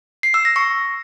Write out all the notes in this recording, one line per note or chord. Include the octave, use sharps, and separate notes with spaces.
C7
E6
A#6
C#6